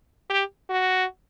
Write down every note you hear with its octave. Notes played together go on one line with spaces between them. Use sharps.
G4
F#4